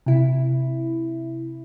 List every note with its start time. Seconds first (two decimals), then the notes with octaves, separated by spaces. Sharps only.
0.06 C3 E4